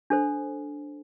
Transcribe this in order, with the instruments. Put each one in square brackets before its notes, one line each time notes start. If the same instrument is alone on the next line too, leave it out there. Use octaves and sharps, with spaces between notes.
[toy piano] D4 A4 C5